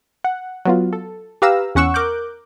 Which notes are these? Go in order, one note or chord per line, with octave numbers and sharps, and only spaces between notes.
F#5
F#3 B3 F4
A4
G4 B4 F5 A#5 E6
E2 C#4 F#5 C#6 E6
A#4 D6 F#6 G6